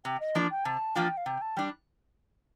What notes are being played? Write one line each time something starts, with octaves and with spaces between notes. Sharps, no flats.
C3 G5
D#5
F3 A#3 D4 F4
G5
C3 A5
F3 A#3 D4 F4 G5
F5
C3 G5
A5
G3 D4 G5